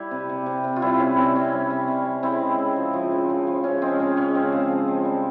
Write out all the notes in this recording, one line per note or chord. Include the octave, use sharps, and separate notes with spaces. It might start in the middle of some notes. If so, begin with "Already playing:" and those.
Already playing: G3 E4 G4
C3
C3
C3
C3
F4
G3 C4 E4
C3 C#4
C3 C4
C3 C#4
G3
C3
C3
G3
C#3 C4 E4
G#3
C#3
F3
F3
C#3
C#3
F3
C#3 C#4
G#3 C4
C#3 C#4
C#3 C#4
G#3 C4
C#3
F3
F3
G3